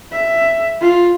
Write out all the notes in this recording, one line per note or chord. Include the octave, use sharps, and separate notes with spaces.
E5
F4